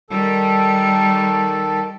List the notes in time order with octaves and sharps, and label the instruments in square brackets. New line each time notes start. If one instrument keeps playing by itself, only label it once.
[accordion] D#3 A4 [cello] G3